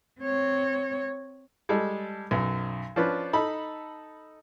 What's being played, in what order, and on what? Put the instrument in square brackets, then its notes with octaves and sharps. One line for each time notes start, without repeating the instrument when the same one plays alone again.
[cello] C4 C#5
[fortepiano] G3 G#3 A4
B1 F#2
F3 C#4 D4 B4
D#4 A4 B5